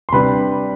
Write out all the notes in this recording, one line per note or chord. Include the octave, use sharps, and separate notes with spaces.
C6
C3 G3 D4 B4 B5